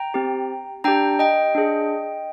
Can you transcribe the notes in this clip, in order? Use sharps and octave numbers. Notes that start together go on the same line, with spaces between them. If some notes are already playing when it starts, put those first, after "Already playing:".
Already playing: G5 A#5
C4 G4
D4 G4 G5 A#5
D#5 G5
D4 G#4